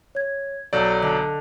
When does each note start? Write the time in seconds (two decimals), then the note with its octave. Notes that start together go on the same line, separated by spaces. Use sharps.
0.15 C#5 G#6
0.73 B1 F#3 A4 D5 G6
1.02 D3 D#5